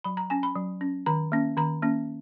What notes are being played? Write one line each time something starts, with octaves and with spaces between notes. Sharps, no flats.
F#3 B5
A#5
C#4 G#5
B5
F#3
C#4
D#3 A#5
A#3 C#4
D#3 A#5
A#3 C#4